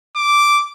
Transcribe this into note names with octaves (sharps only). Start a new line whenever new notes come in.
D6